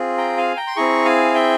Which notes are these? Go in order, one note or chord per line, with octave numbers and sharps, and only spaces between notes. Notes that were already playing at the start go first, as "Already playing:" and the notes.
Already playing: C4 F4 G#4
G5 A#5
F5 G#5
G5 A#5
C6
C4 E4 G#4 A#5 C#6
F5 G#5
E5 G5